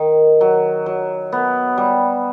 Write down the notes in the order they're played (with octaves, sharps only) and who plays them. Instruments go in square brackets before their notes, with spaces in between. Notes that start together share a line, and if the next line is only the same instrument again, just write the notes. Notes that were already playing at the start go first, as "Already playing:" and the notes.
Already playing: [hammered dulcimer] D#3
F#3
F#3
B3
G3